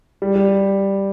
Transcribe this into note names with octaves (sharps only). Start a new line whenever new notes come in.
G3
G3